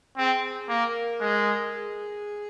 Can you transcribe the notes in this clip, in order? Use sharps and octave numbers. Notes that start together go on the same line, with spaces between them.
C4 G#4
A#3 A#4
G#3
G#4